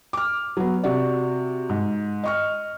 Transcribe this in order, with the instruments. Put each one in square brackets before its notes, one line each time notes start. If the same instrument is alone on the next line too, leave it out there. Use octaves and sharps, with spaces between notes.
[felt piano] D6 F6
F#3 B3
C3 F#4 D5
G#2
D#5 C#6 F6